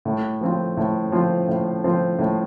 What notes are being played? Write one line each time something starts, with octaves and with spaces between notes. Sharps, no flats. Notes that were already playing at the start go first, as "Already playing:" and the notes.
A2
F3 C4 F4
A2
F3 C4 F4
A2
F3 C4 F4
A2